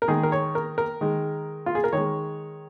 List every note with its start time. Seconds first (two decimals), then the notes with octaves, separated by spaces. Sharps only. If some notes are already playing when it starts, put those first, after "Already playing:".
0.02 A#4
0.08 D#3 G#3 G#4
0.23 A#4
0.32 C#5
0.55 A#4
0.78 A#4
1.01 D#3 G#3
1.66 F4
1.75 G#4
1.84 A#4
1.93 D#3 G#3 C#5